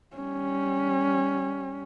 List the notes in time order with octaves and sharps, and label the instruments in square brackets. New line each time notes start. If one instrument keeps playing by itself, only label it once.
[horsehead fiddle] G3 C#4